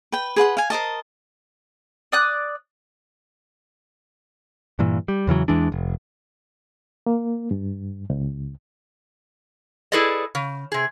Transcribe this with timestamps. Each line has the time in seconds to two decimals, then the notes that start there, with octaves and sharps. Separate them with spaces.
0.12 B4 G5
0.36 G#4 B4 F#5 C6
0.57 F5 G#5
0.70 A#4 C5 D#5 A5
2.12 D5 D#6 F#6
4.79 G2 A#2 E3
5.08 G3
5.27 E2 C#3 E3 F#3
5.48 E2 E3 G#3 D4
5.72 F1
7.06 A#3
7.51 G2
8.10 C#2
9.92 E4 G#4 A4 B4 D5 D#5
10.35 C#3
10.72 C3 G#4